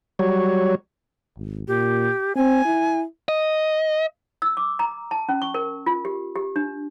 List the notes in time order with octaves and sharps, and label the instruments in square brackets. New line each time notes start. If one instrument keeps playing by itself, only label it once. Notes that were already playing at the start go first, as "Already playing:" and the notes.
[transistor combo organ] F#3 G3 C#5
[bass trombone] G#1
[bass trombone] A#2 [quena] G4
[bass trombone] C4 [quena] G#5
[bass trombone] E4
[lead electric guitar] D#5
[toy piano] E6
D6
A#5
A5
C#4
C#6
A#4
F4
G4
G4
D4